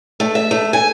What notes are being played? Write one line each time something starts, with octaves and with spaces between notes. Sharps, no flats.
A3
E5
A3
G#5